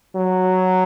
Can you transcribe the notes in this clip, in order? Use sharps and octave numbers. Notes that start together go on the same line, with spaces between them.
F#3